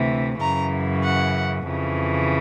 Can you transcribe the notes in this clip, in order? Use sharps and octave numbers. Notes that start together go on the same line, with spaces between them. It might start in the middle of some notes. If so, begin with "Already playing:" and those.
Already playing: D2 C3 E3
F#2 C#3 E3 A#5
F#5
F2 C#3 E3